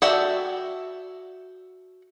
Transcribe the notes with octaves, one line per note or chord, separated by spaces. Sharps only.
F#4 A4 D5 E5 G5